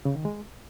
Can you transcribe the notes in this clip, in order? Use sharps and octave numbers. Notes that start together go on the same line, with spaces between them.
C#3
D#3
G#3